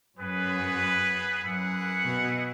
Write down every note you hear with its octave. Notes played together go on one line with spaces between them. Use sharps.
F#2 B3 G#4 B4
F#2 E4 G#4 B4 F#5
B2